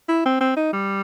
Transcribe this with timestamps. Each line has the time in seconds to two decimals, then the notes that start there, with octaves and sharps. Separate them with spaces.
0.09 E4
0.26 C4
0.41 C4
0.57 D#4
0.73 G3